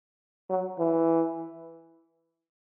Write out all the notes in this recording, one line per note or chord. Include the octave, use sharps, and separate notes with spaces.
F#3
E3